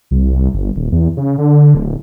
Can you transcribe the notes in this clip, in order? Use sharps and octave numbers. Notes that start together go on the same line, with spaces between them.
C2
G1
D#1
E2
C#3
D3
D1